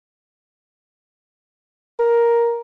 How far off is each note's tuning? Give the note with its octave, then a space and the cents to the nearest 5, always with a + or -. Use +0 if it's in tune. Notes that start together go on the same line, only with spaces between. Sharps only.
A#4 +5